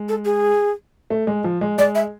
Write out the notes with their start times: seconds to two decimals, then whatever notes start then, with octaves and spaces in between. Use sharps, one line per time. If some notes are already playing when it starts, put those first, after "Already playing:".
Already playing: G#3
0.09 A4
0.25 G#4
1.10 A3
1.27 G#3
1.44 F3
1.61 G#3
1.78 G#3 D5
1.95 E5